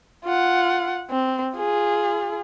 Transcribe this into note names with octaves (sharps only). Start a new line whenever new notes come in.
F4 F#5
C4
F4 G#4